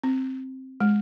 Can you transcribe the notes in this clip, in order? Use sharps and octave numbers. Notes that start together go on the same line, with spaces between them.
C4
G#3